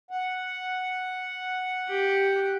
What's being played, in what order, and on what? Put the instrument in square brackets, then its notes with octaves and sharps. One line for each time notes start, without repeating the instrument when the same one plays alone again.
[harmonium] F#5
[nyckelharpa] G4